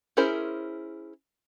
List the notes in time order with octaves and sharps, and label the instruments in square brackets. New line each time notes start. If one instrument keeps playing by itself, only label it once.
[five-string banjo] C#4 E4 G#4 A#4 C5